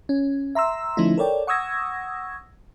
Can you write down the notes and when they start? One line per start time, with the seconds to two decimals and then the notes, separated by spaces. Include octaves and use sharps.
0.09 C#4
0.55 E5 A#5 C6 E6
0.97 D3 F3 A3 C#4 D#4 E4
1.17 A4 A#4 C#5 D5 G5
1.47 F#5 C#6 D#6 E6 G#6 A#6